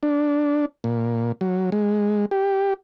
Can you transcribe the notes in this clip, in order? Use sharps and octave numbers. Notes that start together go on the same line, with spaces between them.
D4
A#2
F#3
G#3
G4